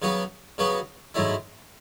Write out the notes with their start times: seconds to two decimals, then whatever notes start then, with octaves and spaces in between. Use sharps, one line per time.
0.02 C#3 F#3 B3 F#4
0.58 C#3 F#3 B3 F#4
1.14 G#2 F#3 A3 E4